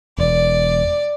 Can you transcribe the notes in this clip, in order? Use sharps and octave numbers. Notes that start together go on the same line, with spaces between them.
E1 D5